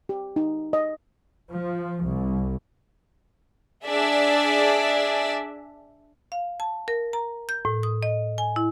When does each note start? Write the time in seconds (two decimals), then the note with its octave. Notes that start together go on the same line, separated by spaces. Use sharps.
0.09 G4
0.36 D#4
0.73 D#5
1.52 F3
2.05 C2
3.86 D4 G#4 D5 E5
6.32 F5
6.60 A5
6.88 A#4
7.13 A#5
7.49 G6
7.65 A2
7.83 D#6
8.03 D#5
8.38 G#5
8.56 E4